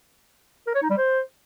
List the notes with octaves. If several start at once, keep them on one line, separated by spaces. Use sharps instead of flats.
A#4
C#5
D#4
G3
C5